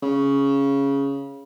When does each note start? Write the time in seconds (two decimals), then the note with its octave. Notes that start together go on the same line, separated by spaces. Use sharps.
0.02 C#3